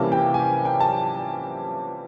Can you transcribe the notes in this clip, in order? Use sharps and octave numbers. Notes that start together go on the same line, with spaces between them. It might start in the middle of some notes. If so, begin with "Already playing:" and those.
Already playing: C3 E3 G3 A#3 C#4 A5
G5
G#5
G5
A5